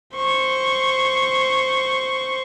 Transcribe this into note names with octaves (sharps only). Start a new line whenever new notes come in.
C5 C#6